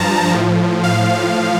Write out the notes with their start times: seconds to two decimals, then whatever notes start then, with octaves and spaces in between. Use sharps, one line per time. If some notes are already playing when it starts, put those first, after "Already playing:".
Already playing: G2 F3 A5 A#5
0.31 A2 F3
0.84 F5